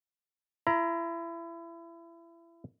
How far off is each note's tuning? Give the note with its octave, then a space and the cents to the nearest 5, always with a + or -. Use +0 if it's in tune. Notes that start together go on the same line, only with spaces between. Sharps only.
E4 +30 A#5 +20